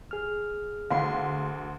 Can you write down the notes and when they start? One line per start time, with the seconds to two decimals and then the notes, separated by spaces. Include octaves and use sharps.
0.11 G#4 F6
0.91 D2 F5 F#5 C6